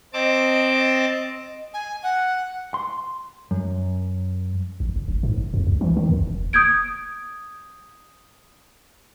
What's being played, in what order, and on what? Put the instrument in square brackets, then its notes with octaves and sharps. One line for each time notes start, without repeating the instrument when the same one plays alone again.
[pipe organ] C4 A5 D6 [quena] D#5
[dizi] G#5
F#5
[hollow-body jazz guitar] C6
F#2
[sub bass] A1
F1
G#1
G#2
F#1
F2
C#2
E3
D#3
D#2
F1
[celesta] D#6 G6 G#6 D7